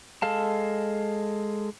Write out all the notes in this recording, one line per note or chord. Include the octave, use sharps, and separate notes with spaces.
G#3 A4 F5 A5